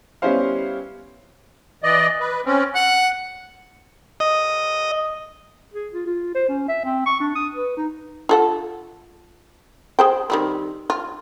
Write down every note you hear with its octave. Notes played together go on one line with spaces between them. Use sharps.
G3 B3 C#4 E4 C5 F5
E3 D5 D#5
B4
C4 C#4
F#5 F#6
D#5
G#4
F4
F4
C5
C#4
E5
C4
C#6
D4
D#6
B4
D#4
F4 A4 F#5
G#4 C5 G5
D#3 G3 C4
F4